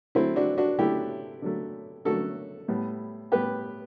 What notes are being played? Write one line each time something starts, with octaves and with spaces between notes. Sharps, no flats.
D3 F#3 A3 C4 E4
D4 F#4
D4 F#4
D3 F#3 A3 E4 G4
D3 F#3 A3
D3 F#3 A3 F#4 A4
A2 G3 B3
A2 G3 B3 G4 B4